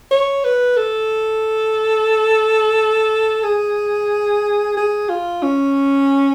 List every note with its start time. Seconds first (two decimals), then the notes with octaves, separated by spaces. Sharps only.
0.11 C#5
0.44 B4
0.77 A4
3.43 G#4
4.77 G#4
5.09 F4
5.43 C#4